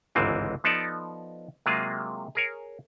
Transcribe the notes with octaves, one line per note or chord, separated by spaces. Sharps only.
G1 C#2 G#2 E3 G#3 C4
F3 B3 D#4 A4 D5
C3 F#3 G#3 A#3 F4 G#4
G#4 A#4 C#5